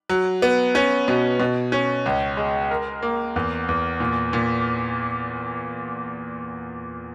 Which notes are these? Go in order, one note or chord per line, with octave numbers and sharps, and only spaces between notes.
F#3
B3
C#4
B2
B2
C#4
C#2
G#3
A#4
A#3
E2
E2
A#2
A#2